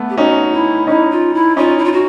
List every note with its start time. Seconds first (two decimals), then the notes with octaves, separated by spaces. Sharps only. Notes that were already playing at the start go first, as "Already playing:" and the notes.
Already playing: A3 B3
0.09 G4
0.18 C#4 D#4 F#4
0.52 E4
0.87 C#4 D#4 E4
1.10 F4
1.34 E4
1.57 C#4 D#4 F4
1.78 E4
1.84 F4
1.92 F#4